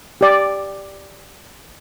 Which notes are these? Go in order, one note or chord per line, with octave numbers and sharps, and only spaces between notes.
G4 D5